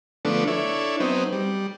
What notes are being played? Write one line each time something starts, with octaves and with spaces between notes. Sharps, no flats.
D3 F3 A3 B3 D4 A4
D4 E4 A4 C#5
F#3 B3 C4 D#4
G3